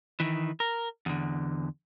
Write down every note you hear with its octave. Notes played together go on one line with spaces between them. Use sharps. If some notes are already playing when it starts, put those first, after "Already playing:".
D#3 E3
A#4
E2 D3